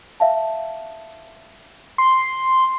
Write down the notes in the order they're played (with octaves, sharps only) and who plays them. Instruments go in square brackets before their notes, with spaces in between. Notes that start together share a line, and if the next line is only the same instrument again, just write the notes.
[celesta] E5 F5 A5
[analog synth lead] C6